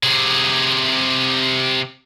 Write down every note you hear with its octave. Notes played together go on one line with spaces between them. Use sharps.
C3 G#4